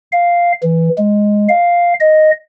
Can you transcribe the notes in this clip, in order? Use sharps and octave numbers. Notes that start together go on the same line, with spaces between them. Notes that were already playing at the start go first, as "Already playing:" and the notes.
F5
E3
G#3
F5
D#5